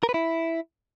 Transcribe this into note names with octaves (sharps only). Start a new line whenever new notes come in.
A#4
B4
E4